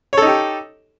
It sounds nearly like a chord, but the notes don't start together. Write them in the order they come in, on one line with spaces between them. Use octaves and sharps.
C#5 A4 D#4 G4